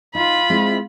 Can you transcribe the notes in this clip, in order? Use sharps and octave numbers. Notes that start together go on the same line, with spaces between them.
D#4 F4 B5
G#3 C4 E4